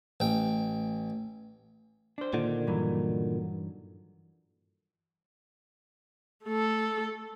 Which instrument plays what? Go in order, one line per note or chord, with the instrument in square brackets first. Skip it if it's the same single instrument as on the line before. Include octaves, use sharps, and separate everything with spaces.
[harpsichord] A1 G5
[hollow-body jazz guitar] D4 C5
[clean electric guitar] A#2 D3 D#3
[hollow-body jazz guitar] G2 E3 F#3
[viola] A3 A4